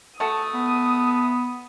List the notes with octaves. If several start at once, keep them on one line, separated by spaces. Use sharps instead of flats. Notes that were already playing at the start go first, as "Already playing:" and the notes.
A3 F#4 A4 D#6
B3